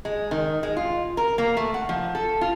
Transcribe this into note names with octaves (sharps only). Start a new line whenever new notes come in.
G#3
D#3
G#3
F4
A#4
A#3
A3
F#5
F3
A4
F4